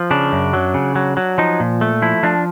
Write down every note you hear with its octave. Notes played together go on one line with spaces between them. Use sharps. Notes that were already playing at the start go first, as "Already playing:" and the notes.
Already playing: F3
C#3 D4
F#2
F#3
C#3
F#3
F#3
F3 D#4
A#2
A3
F3 E4
F3 D4